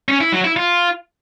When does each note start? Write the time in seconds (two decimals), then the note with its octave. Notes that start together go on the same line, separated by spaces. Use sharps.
0.09 C#4
0.20 E4
0.32 F#3
0.44 E4
0.56 F4